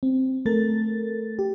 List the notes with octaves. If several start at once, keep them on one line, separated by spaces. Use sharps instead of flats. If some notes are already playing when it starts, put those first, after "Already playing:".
C4
A3 A4 A#4 A6
G4